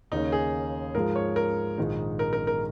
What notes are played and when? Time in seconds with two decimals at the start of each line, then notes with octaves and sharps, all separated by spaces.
0.12 D#2 C#3 A#3 C#4 D#4
0.32 G#4
0.94 G#2 F3 G#3 F4 A#4
1.16 C#5
1.36 A#4
1.78 A#1 G#2 D#3 G#3 D#4
2.19 A#4
2.33 A#4
2.47 A#4